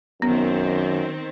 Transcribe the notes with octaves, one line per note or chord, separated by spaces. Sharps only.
F#2 D#3 B3 C4